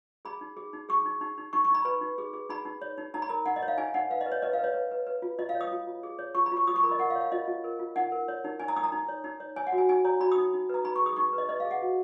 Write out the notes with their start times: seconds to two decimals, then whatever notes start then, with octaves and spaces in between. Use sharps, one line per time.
0.25 G#4 B5
0.41 D#4
0.57 G#4
0.73 D#4
0.89 G#4 C#6
1.05 D#4
1.21 D#4
1.38 D#4
1.53 D#4 C#6
1.65 C#6
1.70 D#4 B5
1.85 B4 B5
2.01 D#4
2.18 G#4
2.33 G#4
2.50 D#4 B5
2.65 D#4
2.82 C#5
2.98 D#4
3.14 D#4 A#5
3.22 B5
3.29 A#4 A#5
3.46 D#4 F#5
3.56 D#5
3.62 C#5
3.68 F5
3.78 D#4 G#5
3.94 D#4 F#5
4.10 B4 F5
4.21 D#5
4.26 B4
4.32 C#5
4.42 B4 D#5
4.53 F5
4.59 B4 C#5
4.74 B4
4.91 B4
5.07 B4
5.22 F4
5.39 F4 D#5
5.49 F5
5.55 C#5
5.61 D#6
5.72 F4
5.87 F4
6.03 G#4
6.19 C#5
6.35 F4 C#6
6.46 B5
6.52 F4
6.57 C#6
6.67 F4 D#6
6.76 C#6
6.83 A#4 B5
6.91 D#5
6.99 A#4 F#5
7.10 F5
7.15 C#5
7.21 F5
7.32 F4 D#5
7.48 F4
7.64 A#4
7.79 F4
7.96 D#4 F#5
8.12 A#4
8.28 C#5
8.44 D#4
8.60 D#4 G#5
8.68 A#5
8.76 D#4 D#6
8.84 A#5
8.92 D#4
9.08 C#5
9.24 D#4
9.40 C#5
9.56 C#5 G#5
9.67 F#5
9.72 F#4
9.78 G#5
9.89 D#4 G#5
10.05 C#5 A#5
10.20 F#4 B5
10.32 D#6
10.37 D#4
10.53 D#4
10.69 B4 A#5
10.85 D#4 B5
10.96 C#6
11.01 G#4
11.06 D#6
11.16 D#4 C#6
11.33 B4
11.38 D#5
11.49 B4 D#5
11.60 F5
11.65 G#4
11.71 F#5
11.82 F#4